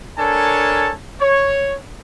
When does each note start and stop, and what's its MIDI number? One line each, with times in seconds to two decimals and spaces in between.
0.18 0.93 62
0.18 0.93 69
0.18 0.93 70
0.18 0.93 73
0.18 0.93 80
0.18 0.93 81
1.20 1.76 73